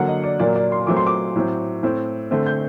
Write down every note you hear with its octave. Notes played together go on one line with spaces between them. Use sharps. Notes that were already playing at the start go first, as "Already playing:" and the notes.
Already playing: D3 F#3 A#3 F#5
D#5
D5
A#2 F#3 A#3 D5
D5
C6
A#2 F#3 A3 C4 D6
C6
D6
A2 F#3 C4
A2 A3 C4
D3 A3 C4
G6